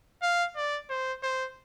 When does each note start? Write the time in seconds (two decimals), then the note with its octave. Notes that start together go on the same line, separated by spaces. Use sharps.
0.22 F5
0.56 D5
0.90 C5
1.23 C5